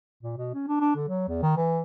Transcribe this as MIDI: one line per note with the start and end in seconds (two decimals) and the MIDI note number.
0.23 0.36 46
0.38 0.53 47
0.54 0.66 61
0.68 0.80 62
0.81 0.94 62
0.96 1.06 50
1.09 1.26 54
1.29 1.38 40
1.43 1.55 51
1.57 1.82 52